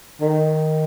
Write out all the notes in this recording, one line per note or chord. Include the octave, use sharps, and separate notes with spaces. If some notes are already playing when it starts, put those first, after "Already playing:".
D#3